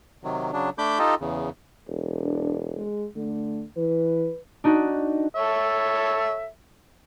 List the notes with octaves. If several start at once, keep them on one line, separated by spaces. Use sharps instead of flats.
C3 D#3 F#3
C#3 F#3 D4
A3 D4 B5 D6 G6
D#4 F4 G4 A4 D#5
E2 C#3
E1
D4
G#3
D3 A3
E3 B4
D4 D#4 F#4
A4 C#5 E5